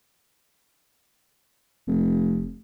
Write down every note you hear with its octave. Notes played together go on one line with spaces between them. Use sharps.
F1